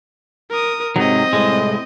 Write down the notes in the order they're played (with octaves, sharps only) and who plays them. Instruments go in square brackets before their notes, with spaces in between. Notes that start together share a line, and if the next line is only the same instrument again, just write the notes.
[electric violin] A#4 D#6
[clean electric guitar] G#2 C3 F#3 [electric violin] C4 D#5
[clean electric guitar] C2 A2 G#3